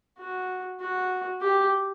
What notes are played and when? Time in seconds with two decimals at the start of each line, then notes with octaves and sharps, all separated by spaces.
0.19 F#4
0.80 F#4
1.41 G4